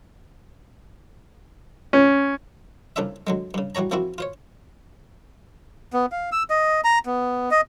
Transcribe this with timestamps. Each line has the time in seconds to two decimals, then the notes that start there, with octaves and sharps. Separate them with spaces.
1.93 C#4
2.96 C2 C#3 D4 F4 E5
3.27 D3 F#3 G#3
3.54 G2 C#3
3.75 E3 G3 F#4 C#5 A#5
3.91 E3 F3 A#3 C4 E4 F#4
4.18 F4 C5 C#5
5.93 B3
6.12 F5
6.32 E6
6.50 D#5
6.84 A#5
7.06 B3
7.51 D#5